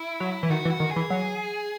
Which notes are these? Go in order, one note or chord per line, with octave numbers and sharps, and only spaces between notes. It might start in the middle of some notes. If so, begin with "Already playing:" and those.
Already playing: E4
F#3
E3
D#3 F#4
E3
F#4
D#3
G#4
E3
F#3